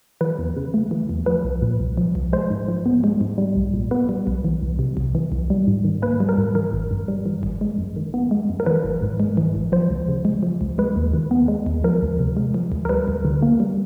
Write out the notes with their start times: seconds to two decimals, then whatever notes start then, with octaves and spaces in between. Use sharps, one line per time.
0.21 E3 B4
0.39 E2
0.57 C#3
0.74 A3
0.91 E3
1.09 E2
1.26 F3 B4
1.44 C2
1.62 A#2
1.80 C2
1.97 F3
2.15 C2
2.33 G#3 C5
2.50 G#2
2.68 F3
2.86 B3
3.04 G#3
3.21 G#2
3.38 G3
3.56 B1
3.73 A#2
3.91 B3 B4
4.09 G3
4.27 B1
4.44 E3
4.62 C2
4.79 C3
4.97 C2
5.15 E3
5.32 C2
5.50 G3
5.67 G#2
5.85 D#3
6.02 A#3 B4
6.20 G3
6.29 A#4
6.38 G#2
6.55 E3 A#4
6.73 G#1
6.91 G2
7.08 G3
7.26 E3
7.43 G#1
7.61 G#3
7.78 F#2
7.96 D#3
8.14 B3
8.31 G#3
8.49 F#2
8.60 A#4
8.66 E3 B4
8.84 G#1
9.02 G#2
9.20 G#3
9.37 E3
9.55 G#1
9.72 F3 C5
9.90 C#2
10.08 C#3
10.25 G#3
10.43 F3
10.61 C#2
10.78 G#3 B4
10.96 D#2
11.14 D#3
11.31 B3
11.48 G#3
11.66 D#2
11.84 F3 A#4
12.02 D2
12.19 C3
12.37 G#3
12.54 F3
12.72 D2
12.85 A#4
12.89 G3 B4
13.08 D2
13.25 D3
13.43 A#3
13.60 G3